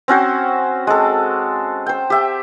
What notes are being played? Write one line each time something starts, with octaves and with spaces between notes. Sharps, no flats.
C4 C#4 F#4 C5
G#3 A4
C5 G5
G4 E5